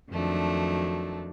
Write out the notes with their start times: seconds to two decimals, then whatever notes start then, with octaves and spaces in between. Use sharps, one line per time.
0.10 F2 D#3 F#3 A3 D4